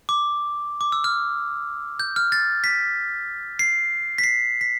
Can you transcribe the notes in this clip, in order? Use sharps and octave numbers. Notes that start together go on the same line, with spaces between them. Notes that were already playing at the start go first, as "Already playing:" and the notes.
D6
D6
E6
F6
G6
F6
A6
B6
C7
B6
C7
B6